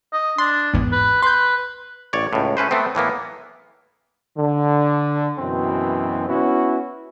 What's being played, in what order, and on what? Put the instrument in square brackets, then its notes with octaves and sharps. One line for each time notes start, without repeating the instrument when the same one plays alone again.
[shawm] D#5
[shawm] D4 [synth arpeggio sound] C6
[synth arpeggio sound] G#1 E2
[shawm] B4
[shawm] B4 [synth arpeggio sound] C6 G6
[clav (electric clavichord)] A1 C#5 D5
C#2 A2
A3 C#4 B4 C5
A3 B3 C4
A2 E3 A#3 B3
[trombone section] D3
F#2 B2 E3 C4
B3 C#4 E4 F#4